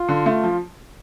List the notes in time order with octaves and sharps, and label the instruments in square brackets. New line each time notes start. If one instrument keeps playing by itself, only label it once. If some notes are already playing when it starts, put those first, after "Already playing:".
Already playing: [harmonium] F4
[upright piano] D3
A3
F3